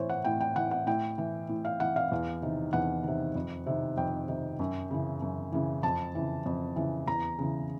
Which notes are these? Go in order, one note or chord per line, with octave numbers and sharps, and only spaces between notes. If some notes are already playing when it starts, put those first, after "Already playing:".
Already playing: A2 E3 C5 C#5
F#5
A2 G5
G5
E3 F#5
F#5
A2 G5
E3
A2
F5
E3 F#5
F5
E2
C3 D#3
E2 F#5
C3 D#3
F2
C3 D#3
F2 G5
C3 D#3
F#2
C#3 E3
F#2
C#3 E3
F2 A5
C#3 E3
F2
C#3 E3
E2 A#5
C#3 E3